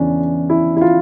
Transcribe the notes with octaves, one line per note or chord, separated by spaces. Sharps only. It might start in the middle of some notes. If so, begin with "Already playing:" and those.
Already playing: E2 C#3 E3 C#4 D4
E4
E4
F4